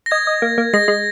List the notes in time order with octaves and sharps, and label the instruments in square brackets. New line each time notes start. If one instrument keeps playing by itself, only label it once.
[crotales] A#6
[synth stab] D#5 [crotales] G#6
[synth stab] D#5
A#3
A#3
[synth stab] G#3 [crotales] A#6
[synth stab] G#3